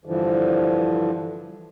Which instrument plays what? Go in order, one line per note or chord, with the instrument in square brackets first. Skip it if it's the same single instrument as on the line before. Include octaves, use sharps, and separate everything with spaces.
[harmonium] G2 D3 E3 F3